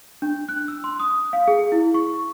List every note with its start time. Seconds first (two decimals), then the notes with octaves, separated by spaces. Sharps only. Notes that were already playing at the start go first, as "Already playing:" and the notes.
0.22 D4
0.49 F#6
0.68 E6
0.84 C6
1.00 D#6
1.33 F5
1.48 G#4
1.72 E4
1.94 C#6